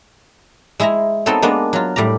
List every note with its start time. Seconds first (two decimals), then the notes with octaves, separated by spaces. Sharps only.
0.80 G#3 E4 G#4 E5 A#5
1.26 B3 C4 D#4 F#4 A4 C#5
1.42 G#3 A#3 B3 D4
1.73 F#3 F4
1.96 A2 G3 D5 A#5